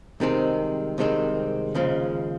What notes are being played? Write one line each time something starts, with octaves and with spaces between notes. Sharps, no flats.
C2 C3 D#3 G#3 C4
C2 C3 D#3 G#3 C4
D#2 C#3 F3 G#3